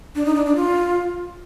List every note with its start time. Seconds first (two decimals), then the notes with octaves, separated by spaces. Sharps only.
0.15 D4
0.25 D#4
0.36 D4
0.46 D4
0.56 F4